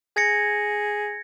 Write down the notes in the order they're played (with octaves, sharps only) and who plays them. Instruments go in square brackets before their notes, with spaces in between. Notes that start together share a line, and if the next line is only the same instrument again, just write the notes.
[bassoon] G#4 [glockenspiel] G#6 A#6 C#7